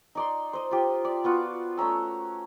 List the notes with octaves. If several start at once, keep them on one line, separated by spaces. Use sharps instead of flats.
D#4 D5 C6
C5 D#5
F4 G4
D5
B3 F4 F#4
A3 C#4 A#5 E6